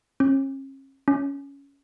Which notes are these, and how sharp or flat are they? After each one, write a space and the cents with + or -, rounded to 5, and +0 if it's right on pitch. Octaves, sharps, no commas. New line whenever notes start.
C#4 -40
C#4 +10